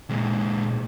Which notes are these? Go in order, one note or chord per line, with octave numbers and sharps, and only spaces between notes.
A#2 G#3